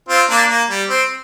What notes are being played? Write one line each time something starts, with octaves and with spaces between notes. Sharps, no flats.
C4 F4
A#3 D4
A#3
G3
C4